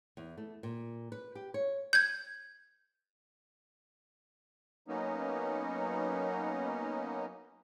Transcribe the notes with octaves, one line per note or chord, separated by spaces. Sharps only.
E2
A3
A#2
B4
G4
C#5
G6 G#6
F#3 A#3 B3 C#4 D#4